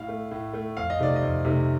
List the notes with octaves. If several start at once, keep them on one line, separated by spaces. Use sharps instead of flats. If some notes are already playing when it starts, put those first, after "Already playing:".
Already playing: A2 F5
A3
A2
A3
F2 F5
D#5
C3 D#3 A3 D5
D#5
F2
C3 D#3 A3